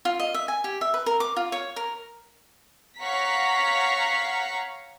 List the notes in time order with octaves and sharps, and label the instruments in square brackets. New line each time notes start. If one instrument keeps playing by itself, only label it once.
[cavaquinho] F4
D#5
E5
G#5
G4
E5
B4
A#4
D6
F4
C#5
A#4
[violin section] C#5 F5 F#5 A#5 C#6 B6